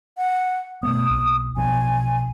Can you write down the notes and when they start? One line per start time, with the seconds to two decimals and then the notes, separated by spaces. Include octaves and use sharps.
0.17 F#5
0.83 B2 A3 B3 D#6
1.10 B1 A#3
1.56 B1 B2 F3 G#5